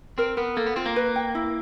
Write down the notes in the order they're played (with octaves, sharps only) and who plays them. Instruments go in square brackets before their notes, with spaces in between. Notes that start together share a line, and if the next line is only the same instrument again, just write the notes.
[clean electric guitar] C4 [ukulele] A#4
[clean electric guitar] B3 [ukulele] A#4
[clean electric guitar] A#3 [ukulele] A4
[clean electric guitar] B3
[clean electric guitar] C4 [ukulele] F4
[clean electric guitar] A#3
[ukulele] B4
G5
E4